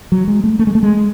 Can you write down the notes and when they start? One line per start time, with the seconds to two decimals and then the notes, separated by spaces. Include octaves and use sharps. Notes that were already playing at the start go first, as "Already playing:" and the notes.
0.12 F#3
0.28 G#3
0.44 A3
0.59 A3
0.67 G#3
0.75 A3
0.83 G#3